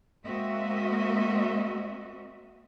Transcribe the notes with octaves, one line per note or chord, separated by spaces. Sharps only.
G#3 A#3 C4 F#4 D#5 E5